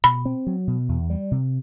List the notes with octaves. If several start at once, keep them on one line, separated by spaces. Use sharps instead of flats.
B2 B5
C4
F#3
B2
E2
G3
C3